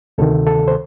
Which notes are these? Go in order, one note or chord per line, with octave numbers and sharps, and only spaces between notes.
D2 C3 D#3 A4
A4
C5